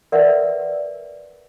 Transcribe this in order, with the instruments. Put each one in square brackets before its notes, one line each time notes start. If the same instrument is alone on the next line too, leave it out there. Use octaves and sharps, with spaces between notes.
[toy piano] A#4 B4 D5 E5 F#5